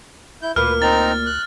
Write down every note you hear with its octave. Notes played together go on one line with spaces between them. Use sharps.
E4 G6
D2 A#2 A#3 B4 F6
C4 D#4 A#5 A6
F#6